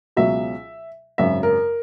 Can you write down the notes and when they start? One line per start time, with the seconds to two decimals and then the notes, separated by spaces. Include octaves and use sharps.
0.17 C#2 B2 F#3 E5
1.18 G#1 F#2 C#3 E5
1.43 A#4